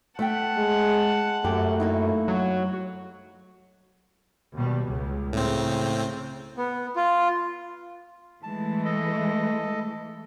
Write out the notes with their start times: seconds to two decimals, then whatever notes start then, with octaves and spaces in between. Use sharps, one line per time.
0.19 A3 E5 F#5 G5 A5
0.58 G#3
1.45 F#2 A3 G4
1.80 A#3 D#4 E4
2.28 F#3 F#4
4.54 D#2 B2 G3
4.87 C#2
5.33 A2 C#3 C4
6.57 B3
6.96 F4
8.43 E3 G#3 A3 A5
8.85 A4 D#5